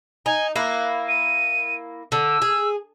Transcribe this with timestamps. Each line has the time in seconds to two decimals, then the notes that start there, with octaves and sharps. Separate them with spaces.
0.26 D#4 G#5
0.56 A#3 E4 F#6
1.08 D#7
2.12 D3 E6
2.42 G#4